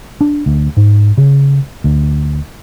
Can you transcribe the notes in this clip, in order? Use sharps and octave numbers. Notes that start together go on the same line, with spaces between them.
D4
D2
G#2
C#3
D2